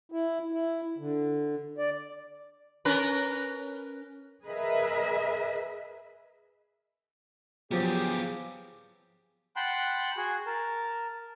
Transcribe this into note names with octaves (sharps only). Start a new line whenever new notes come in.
E4
E4
D3
D5
C#4 A#4 B4
G#4 A#4 B4 D#5 E5
F3 F#3 B3 F4 G4 G#4
F#5 G5 A5 B5 C6 F#6
F#4 G#4
A#4 A5